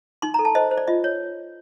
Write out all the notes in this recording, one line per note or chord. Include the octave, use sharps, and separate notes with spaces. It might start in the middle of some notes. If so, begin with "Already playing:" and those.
D#4 C6
A#5
A4
A5
C5 D#5
C5
D5
F4 D#5
C#5